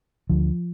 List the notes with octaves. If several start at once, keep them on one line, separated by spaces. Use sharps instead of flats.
D2 D3 F3